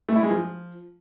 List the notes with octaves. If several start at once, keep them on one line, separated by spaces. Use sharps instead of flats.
A3
E4
G#3
F3